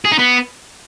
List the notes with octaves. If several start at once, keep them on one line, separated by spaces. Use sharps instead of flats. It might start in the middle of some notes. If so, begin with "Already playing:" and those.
G#4
D#4
B3